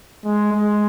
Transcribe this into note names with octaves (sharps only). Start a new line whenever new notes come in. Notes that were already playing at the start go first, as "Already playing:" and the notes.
G#3
G#3